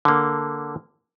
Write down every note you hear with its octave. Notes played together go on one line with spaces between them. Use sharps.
D3 A#3